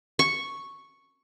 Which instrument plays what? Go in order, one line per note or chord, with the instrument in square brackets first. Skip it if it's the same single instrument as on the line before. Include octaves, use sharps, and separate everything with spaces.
[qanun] C#6